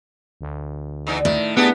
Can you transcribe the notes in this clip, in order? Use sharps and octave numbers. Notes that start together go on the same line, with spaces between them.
D2
E2 D#4
A2 D#3
B3 D4 G4 G#4